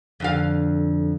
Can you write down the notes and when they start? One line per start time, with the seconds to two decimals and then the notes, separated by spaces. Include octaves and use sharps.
0.20 F2 D3 F5